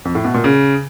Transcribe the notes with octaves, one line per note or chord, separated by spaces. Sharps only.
F2
A2
B2
A#2
C#3